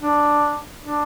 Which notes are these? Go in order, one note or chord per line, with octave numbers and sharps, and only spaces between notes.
D4
D4